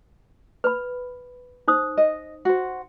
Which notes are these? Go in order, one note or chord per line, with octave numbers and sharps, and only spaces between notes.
B4 B5
D#4 C5 D#6
D#5
F#4 C5